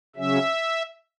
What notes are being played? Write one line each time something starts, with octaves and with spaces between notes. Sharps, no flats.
C#3 F#3 C#4 E5